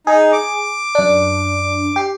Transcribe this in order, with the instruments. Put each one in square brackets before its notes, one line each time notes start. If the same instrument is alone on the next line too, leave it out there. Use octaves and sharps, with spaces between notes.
[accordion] D#4 [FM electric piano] G#4
[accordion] D6
[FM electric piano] F#2 D4
G4 C7